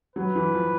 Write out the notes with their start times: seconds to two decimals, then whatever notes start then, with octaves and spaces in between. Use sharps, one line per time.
0.16 F#3 B4
0.35 E3
0.55 F3